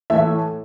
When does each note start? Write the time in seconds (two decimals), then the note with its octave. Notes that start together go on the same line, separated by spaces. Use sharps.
0.10 A2 E3 A3 E5